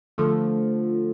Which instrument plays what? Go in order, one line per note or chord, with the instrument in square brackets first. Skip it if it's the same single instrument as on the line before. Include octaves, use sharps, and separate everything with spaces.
[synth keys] D3 F3 A3